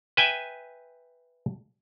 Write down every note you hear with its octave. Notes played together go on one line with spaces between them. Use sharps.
B4 E5 G5 G#5